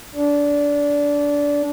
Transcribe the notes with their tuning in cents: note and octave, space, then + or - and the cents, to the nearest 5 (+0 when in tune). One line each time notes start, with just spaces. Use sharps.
D4 -20